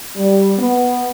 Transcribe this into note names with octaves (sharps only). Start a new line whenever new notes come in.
G3
B3